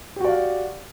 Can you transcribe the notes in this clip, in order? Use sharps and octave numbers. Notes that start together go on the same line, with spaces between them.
F#4 G4 D5 F5